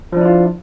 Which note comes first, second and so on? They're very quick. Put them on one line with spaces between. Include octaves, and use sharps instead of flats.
F3 D4 E4 F4